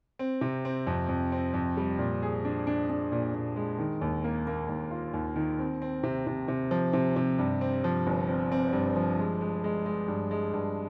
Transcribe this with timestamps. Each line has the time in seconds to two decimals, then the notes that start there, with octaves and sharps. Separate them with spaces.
0.19 C4
0.41 C3
0.65 C4
0.87 F2
1.09 F2
1.32 C4
1.54 F2
1.77 G3
1.99 A#2
2.22 G#4
2.45 D4
2.67 D4
2.90 D4
3.12 A#2
3.34 A#2
3.56 G#3
3.78 D#3
4.01 D#2
4.24 A#3
4.47 A#3
4.69 D#2
4.91 F4
5.14 D#2
5.36 D#3
5.58 C4
5.82 C4
6.03 C3
6.27 C3
6.48 C3
6.71 F3
6.93 C3
7.16 C3
7.38 G2
7.61 C4
7.84 F3
8.07 G1
8.28 C4
8.52 C4
8.73 G2
8.96 F3
9.19 G#3
9.41 G#3
9.64 G#3
9.86 G#3
10.08 G2
10.31 G#3
10.54 G2